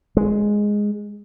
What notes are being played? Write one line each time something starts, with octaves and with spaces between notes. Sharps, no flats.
G#3